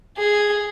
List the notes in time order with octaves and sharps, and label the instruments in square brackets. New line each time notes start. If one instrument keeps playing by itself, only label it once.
[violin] G#4